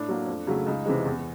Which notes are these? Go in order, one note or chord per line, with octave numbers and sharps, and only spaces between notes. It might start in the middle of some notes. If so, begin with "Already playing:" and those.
Already playing: A2 D4
F#3 A#3
F2
C#3 F#3 A3
C#2 D#4
C3 E3 G#3
E2